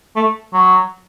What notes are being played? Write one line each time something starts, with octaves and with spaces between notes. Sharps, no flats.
A3
F#3